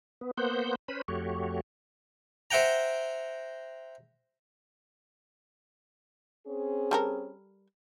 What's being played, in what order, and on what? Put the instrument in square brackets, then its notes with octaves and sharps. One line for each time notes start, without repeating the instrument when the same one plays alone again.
[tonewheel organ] B3
A#3 B3 C5 F#5 G6
C#4 B4 C5 B5
F2 A3 F#4 G4 C#5
[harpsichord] C5 E5 F#5 G5 A#5
[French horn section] C4 C#4 G#4
[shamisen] G3 A4 A#4